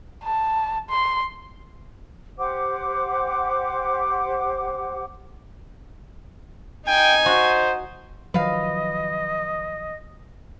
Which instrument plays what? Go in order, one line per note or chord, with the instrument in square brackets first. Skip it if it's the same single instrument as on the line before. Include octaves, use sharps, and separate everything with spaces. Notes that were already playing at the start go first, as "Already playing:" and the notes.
[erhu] A5
C6
[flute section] G4 C5 F#5 D6
[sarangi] D#4 [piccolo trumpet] G5 [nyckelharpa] G#5
[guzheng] F#4 [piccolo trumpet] C5
[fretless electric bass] D#3 F3 F#3 [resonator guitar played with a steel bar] B4 F5 [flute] D#5